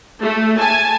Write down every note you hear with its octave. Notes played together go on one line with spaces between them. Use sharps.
A3
G#5 A5